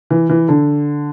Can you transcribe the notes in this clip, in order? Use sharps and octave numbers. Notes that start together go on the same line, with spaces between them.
E3
E3
D3